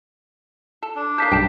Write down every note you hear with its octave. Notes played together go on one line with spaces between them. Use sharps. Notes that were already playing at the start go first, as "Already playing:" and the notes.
A4
D4
A#3 D#4 A4 G6 B6 C7
B1 G2 G5 A5 B5